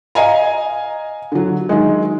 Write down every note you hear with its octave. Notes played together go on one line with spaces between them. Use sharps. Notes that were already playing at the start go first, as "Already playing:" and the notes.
D#5 F5 G#5 A#5
D3 F#3
D#3 F#3 G#3